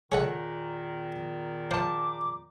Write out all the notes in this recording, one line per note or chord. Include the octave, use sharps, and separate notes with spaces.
E2 A#2 D#3 G#4 A4 C#5 D#5 F#5
F3 C5 A5 D6